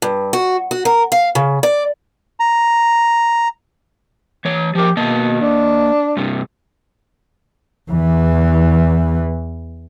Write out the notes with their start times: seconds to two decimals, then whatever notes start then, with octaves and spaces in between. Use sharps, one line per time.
0.02 G2
0.33 F#4
0.71 F#4
0.85 A#4
1.12 F5
1.35 C#3
1.63 D5
2.40 A#5
4.45 E3 C#5
4.75 F3 G4 A#4
4.97 B2 A#3 D#5 A5
5.41 D4
6.17 G2 C3
7.91 E2 E3